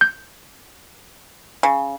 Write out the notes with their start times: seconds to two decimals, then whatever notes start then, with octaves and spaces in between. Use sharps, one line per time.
0.01 G6
1.63 C#3